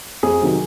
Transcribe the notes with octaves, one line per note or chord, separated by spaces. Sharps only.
F2 G#4
C3 D#3 F#3